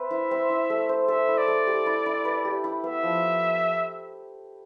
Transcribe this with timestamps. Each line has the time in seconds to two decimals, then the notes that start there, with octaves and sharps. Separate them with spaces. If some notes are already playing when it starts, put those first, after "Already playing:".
Already playing: C4 B4 E5
0.11 E4
0.31 C4
0.50 E4
0.70 A3
0.89 C5
1.08 A4 E5
1.28 E4
1.38 D5
1.48 A3
1.67 G4
1.86 E4
2.06 E4
2.25 B4
2.45 G4
2.64 E4
2.84 B3 E5
3.03 F3